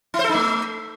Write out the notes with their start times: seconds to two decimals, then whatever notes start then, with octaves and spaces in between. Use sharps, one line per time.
0.14 E4
0.19 C5
0.24 A4
0.29 D#4
0.34 A3